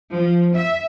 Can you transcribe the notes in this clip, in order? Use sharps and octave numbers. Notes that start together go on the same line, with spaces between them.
F3
E5